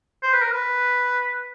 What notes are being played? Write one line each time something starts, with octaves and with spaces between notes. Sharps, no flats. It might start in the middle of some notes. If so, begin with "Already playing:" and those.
C5
B4
A#4
B4